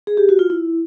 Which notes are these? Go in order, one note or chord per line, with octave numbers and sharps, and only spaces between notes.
G#4
G4
F#4
F4
E4